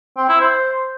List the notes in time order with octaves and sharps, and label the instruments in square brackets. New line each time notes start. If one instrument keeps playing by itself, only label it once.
[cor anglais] C4
E4
C5